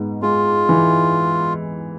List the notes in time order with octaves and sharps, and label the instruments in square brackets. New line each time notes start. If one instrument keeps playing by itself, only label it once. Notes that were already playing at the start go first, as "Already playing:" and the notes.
Already playing: [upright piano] G#2 B3
[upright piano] G#3 [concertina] F4
[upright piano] E3